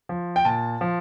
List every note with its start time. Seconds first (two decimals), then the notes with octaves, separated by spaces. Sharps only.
0.09 F3
0.36 G5
0.45 A#2 A5
0.81 F3